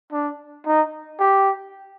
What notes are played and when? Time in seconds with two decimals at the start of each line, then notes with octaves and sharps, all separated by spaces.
0.12 D4
0.66 D#4
1.20 G4